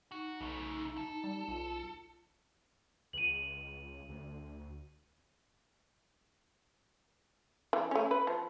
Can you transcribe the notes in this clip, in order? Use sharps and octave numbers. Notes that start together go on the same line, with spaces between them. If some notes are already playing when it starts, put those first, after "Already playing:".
D#4 F#4
B1 C#3 A3
A4
G3
B1 F4
C#2 D#7 F#7
D2
E3
A3 C#4
B4
F3